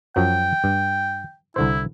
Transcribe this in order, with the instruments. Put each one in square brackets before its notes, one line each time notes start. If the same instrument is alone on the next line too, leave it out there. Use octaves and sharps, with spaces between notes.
[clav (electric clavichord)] F#2 F3 F#3 [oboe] G5
[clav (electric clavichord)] G2
[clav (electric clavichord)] C2 D3 C5 [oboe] E4